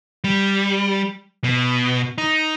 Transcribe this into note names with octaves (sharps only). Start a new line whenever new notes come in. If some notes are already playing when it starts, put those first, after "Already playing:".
G3
B2
D#4